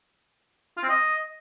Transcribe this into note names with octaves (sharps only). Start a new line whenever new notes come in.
F4
C4
D#5